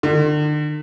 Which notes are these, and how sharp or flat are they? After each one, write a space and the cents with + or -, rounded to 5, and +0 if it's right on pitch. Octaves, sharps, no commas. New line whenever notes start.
D3 +40